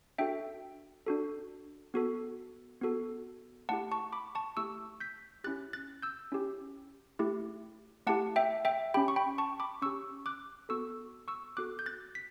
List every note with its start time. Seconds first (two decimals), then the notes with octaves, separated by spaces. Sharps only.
0.18 D4 F#4 A4 E5 G5
1.07 D4 F#4 A4
1.94 B3 F#4 A4
2.81 B3 F#4 A4
3.69 A3 E4 G4 F#5 A5
3.92 A5 C#6
4.13 B5 D6
4.35 A5 C#6
4.57 A3 E4 G4 C#6 E6
5.00 G6 B6
5.44 C#4 E4 G4 F#6 A6
5.73 F#6 A6
6.02 E6 G6
6.32 C#4 E4 G4
7.19 A3 E4 G4
8.07 A3 E4 G4 F#5 A5
8.36 E5 G5
8.65 E5 G5
8.94 C#4 G4 G5 B5
9.08 C#6
9.16 G5 B5
9.38 A5 C#6
9.60 B5 D6
9.82 C#4 G4 C#6 E6
10.26 D6 F#6
10.69 B3 F#4 A4 C#6 E6
11.28 C#6 E6
11.57 B3 F#4 A4 D6 F#6
11.79 G6
11.86 F#6 A6
12.15 B6